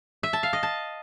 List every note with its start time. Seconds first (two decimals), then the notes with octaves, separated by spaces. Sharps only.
0.23 E5
0.33 A5
0.43 F5
0.53 D#5
0.63 A5